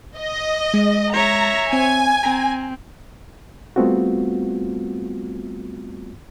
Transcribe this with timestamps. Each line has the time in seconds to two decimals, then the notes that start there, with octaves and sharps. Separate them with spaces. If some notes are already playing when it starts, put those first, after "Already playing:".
0.18 D#5
0.74 G#3
1.14 C#5 E5 A#5
1.73 C4 G#5
2.23 C4 A#5
3.76 G3 A3 B3 C4 F4 F#4